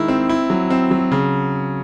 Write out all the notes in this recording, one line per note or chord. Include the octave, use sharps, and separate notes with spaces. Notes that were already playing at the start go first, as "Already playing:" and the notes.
Already playing: D#3 G#3 E4
C4
E4
F#3
C4
F#3
C#3